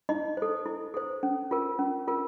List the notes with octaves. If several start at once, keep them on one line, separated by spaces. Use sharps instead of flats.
D#4 E4 D#5
A4 C5
E4
A4 C5
C#4
F4 A#4
C#4
F4 A#4